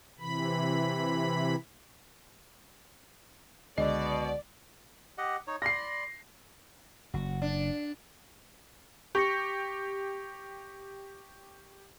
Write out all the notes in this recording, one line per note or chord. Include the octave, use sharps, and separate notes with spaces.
C3 E3 B5
C#2 B2 D3 G#3 D5 D#5
G4 D#5 F#5
D#4 C#5
D5 B5 C6 A#6 C7
F#1 F#4
D4
G4 C#6 A#6 C#7